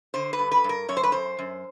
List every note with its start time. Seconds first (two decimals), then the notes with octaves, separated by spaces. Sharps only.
0.14 D3 C5
0.33 B4
0.39 G2
0.51 B4
0.64 G2
0.69 A#4
0.88 F#2 C#5
0.97 C5
1.03 B4
1.12 F#2 C5
1.39 F#2